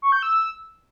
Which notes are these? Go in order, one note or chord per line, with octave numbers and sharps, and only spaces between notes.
C#6
G6
E6